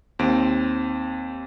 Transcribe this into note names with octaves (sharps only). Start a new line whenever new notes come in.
D#2 C4 D7